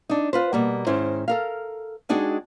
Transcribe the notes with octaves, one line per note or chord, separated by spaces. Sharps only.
D4 D#4
F4 B4 C5
B2 G3 A#3
G#2 D#3 C#4 E4 C5
A4 A#4 F5
G#3 D4 D#4 F#4 G#4 G5